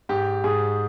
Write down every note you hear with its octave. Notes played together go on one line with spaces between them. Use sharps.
G#2 G4
G#2 G#4